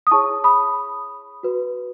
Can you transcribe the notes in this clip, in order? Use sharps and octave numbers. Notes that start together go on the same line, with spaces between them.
D#6
E4 G#4 C#5 A5 C#6
B5 D#6
F#4 B4